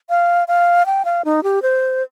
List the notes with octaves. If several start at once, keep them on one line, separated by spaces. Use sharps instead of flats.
F5
F5
G5
F5
D#4
G4
C5